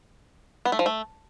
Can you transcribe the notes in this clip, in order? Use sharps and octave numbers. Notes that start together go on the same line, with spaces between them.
B3
A3
F3
A3